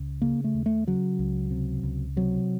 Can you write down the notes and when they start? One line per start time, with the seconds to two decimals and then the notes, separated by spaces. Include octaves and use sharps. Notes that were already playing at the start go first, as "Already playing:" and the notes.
Already playing: C#2
0.22 C#3 A#3
0.44 A3
0.54 D#2
0.66 A3
0.87 C#3 F#3
1.19 C#2
1.51 C3
1.83 C#2
2.16 C3 F#3